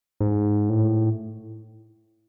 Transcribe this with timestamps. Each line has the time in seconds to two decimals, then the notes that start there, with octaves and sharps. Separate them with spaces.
0.20 G#2
0.69 A2